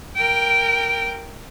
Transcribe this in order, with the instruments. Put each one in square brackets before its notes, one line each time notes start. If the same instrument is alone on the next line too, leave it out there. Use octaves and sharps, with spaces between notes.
[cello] A#4 G5